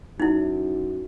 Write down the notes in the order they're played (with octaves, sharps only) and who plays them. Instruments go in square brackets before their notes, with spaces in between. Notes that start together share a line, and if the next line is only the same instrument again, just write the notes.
[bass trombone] F#2 [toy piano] D#4 E4